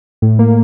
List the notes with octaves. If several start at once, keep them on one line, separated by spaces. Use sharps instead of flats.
A2
A#3